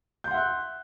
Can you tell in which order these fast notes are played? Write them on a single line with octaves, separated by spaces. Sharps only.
G6 C6 F#5 E5 F#6